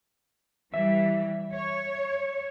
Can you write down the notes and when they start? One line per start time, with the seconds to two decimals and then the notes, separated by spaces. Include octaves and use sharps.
0.74 E3 G3 E5
1.54 C#5